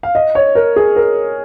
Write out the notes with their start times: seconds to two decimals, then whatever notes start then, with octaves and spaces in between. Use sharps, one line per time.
0.03 F5
0.15 D#5
0.35 C#5
0.55 A#4
0.76 G#4
0.96 A#4